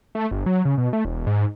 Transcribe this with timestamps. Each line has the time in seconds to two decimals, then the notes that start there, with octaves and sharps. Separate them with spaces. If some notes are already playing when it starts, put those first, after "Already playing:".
0.15 A3
0.31 G1
0.46 F#3
0.65 C#3
0.78 B2
0.93 A3
1.05 E1
1.27 G#2